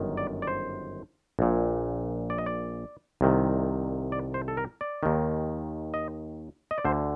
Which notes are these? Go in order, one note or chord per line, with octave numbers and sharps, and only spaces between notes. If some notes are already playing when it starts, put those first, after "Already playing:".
Already playing: G1 F#2 D#3
D5
D5
C5
A#1 A#2
D5
D#5
D5
C2 C3 D#3
D5
C5
A4
A#4
D5
D#2 D#3
D#5
D#5
D5
D2 D3 C5